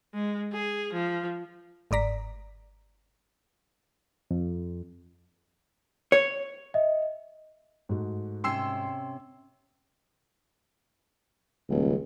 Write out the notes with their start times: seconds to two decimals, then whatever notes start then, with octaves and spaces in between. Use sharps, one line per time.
0.14 G#3
0.53 G#4
0.93 F3
1.91 G1 G#2 D5 A#5 B6
4.31 F2
6.12 C#5
6.74 D#5 E5
7.89 G#2 A3 F#4
8.44 C3 C#4 G5 C6 E6 C7
11.69 D#1 C#2